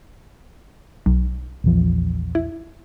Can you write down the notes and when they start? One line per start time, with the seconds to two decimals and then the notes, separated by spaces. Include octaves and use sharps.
1.06 B1
1.64 A#1 E2 F3
2.35 E4